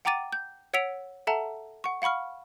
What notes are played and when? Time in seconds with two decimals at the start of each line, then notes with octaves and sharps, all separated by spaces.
0.05 F#5 G5 A#5 D6 A6 D#7
0.33 G6
0.74 C#5 F#5 E6 B6 D7 F7
1.27 A4 E5 F#5 A5 A#5
1.84 F#5 C#6
2.02 F5 F#5 B5 C#6 F6